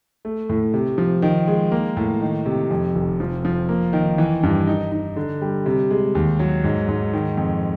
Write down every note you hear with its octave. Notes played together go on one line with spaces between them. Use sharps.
A3
A2
C3
F3
D#3
G#3
A#3
A2
D#3
C3
F2
F1
F3
F3
A#3
D#3
E3
G2
D#4
D#4
D3
G3
C3
G#3
D#2
F#3
G#2
G#2
D#3
F2